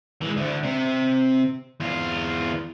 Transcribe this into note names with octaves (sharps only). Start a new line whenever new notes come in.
E3 G#3
D2 D3
C3
E2 F4